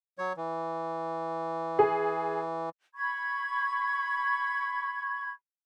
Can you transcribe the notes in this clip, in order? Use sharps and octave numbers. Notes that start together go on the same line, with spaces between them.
F#3 C#5
E3
G#4
B5 C#6 G#6